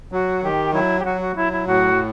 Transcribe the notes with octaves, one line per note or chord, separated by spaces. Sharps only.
F#3 F#4
D#3 G4
F#3 E4
G4
F#3 F#4
F#4
F#3 E4
E4
A2 F#4